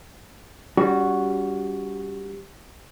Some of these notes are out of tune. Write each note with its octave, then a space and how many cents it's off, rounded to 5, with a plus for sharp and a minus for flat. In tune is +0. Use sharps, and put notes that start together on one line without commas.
G3 +5 C#4 +45 F#4 +0